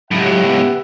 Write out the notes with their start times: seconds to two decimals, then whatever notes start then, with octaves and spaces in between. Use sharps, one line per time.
0.11 C#2 A2 F#3 G4 E5 F#5
0.45 B3